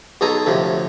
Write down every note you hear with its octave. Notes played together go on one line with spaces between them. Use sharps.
B1 B2 G#4 A4 A#5 D#6
D2 A2 C3 F3